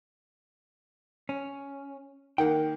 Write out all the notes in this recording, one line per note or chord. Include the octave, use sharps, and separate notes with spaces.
C#4
D#3 A#3 F#5 G5